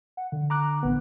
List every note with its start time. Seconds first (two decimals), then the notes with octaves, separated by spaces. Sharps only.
0.17 F#5
0.32 D3
0.50 A#5 D6 F#6
0.83 A1 B3